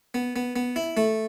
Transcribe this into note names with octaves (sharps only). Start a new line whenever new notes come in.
B3
B3
B3
E4
A3